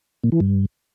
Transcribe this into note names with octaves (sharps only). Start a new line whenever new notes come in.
A#2
E3
G2